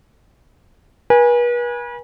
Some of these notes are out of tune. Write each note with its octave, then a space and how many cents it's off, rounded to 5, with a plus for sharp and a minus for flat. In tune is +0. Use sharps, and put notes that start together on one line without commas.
B4 -40 G#5 -10